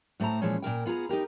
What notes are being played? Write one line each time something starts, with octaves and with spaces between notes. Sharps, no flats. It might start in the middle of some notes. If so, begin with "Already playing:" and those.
A2 A3 C5 A5 A#5
A#2 E3 F3 G#3 C#4
A#2 E3 A#4 G5
B3 F4 G#4 A#5
D#4 F4 G4 A#4